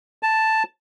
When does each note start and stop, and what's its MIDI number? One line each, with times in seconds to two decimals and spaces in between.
0.23 0.63 81